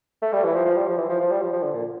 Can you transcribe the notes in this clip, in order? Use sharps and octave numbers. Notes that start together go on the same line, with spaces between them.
A3
G3
E3
F3
F3
G3
F3
E3
F3
F3
G3
F3
F3
D3
A#2